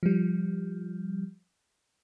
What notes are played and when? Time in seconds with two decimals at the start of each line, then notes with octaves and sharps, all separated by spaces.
0.03 F3 G3